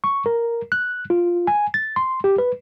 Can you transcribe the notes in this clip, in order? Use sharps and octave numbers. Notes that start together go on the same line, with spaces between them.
C#6
A#4
F#6
F4
G#5
A6
C6
G4
B4